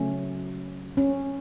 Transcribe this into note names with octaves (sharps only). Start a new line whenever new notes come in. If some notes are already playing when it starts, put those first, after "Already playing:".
Already playing: C#3 F#3 A3 C#4
C#4